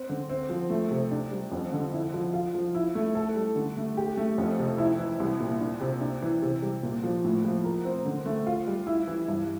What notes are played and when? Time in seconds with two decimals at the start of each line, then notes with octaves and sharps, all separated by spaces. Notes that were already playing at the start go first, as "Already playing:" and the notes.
Already playing: C4
0.09 D3
0.30 C4
0.49 F3
0.70 A3
0.91 C3
1.11 D4
1.31 G3
1.52 F2
1.72 D3
1.93 E4
2.14 F3
2.34 F4
2.55 F3
2.75 E4
2.95 A3
3.15 A4
3.36 G3
3.56 D3
3.77 A3
3.97 G4
4.17 A3
4.38 F2
4.59 C3
4.78 E4
4.99 E3
5.20 C2
5.40 A#2
5.60 D4
5.80 C3
6.01 D4
6.22 E3
6.42 C3
6.62 G3
6.83 A#2
7.03 F3
7.24 A2
7.45 F3
7.64 A#4
7.85 C4
8.05 D3
8.26 A3
8.47 F4
8.67 G3
8.87 E4
9.08 E3
9.28 G2